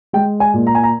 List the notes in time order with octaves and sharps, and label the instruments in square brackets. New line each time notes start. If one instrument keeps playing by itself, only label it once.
[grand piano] G#3 G5
G#5
A#2
A#5
G#5
A#5